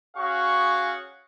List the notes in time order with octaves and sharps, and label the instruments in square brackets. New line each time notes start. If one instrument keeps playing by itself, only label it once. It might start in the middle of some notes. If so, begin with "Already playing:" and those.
[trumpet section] C#4 F#4 G#4 F5 C#6